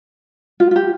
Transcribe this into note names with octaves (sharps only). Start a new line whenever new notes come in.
F4
F4
G4